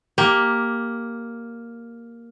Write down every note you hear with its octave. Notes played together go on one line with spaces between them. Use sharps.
A#3 G4